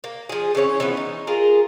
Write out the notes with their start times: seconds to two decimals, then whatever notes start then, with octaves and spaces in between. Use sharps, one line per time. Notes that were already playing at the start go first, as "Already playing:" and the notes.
0.04 A#3
0.29 F3 G#4
0.55 C#3 E3 C#4 C#5
0.80 E3 F3 B3
0.97 D#4
1.27 F4 G#4 A#4